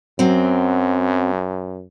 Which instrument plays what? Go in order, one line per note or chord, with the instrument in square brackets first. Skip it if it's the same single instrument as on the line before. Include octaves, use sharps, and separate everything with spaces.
[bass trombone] F#2 [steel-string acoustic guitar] F#3 C4